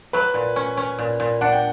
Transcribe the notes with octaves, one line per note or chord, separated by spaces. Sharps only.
F#3 B4
A#2
C#4
C#4
A#2
A#2
D4 F#5
G5